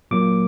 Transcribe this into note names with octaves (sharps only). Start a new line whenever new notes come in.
A#2 F#3 A#3 D6